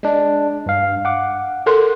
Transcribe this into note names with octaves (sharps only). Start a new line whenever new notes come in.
G#3 D4 D#5
G2 F5
F#5 D6
A4 A#4 C6